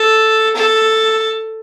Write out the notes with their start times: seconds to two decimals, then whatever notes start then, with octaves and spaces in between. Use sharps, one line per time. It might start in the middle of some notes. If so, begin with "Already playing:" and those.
Already playing: A4
0.56 A4